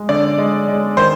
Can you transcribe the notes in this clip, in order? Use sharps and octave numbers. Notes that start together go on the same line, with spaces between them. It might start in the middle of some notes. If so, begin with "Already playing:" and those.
Already playing: G#3
D3 D5
G#3
G#3
D#3 C5